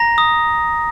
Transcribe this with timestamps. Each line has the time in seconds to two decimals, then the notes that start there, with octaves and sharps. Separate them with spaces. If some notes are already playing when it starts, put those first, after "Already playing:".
Already playing: A#5 A#6
0.18 D#6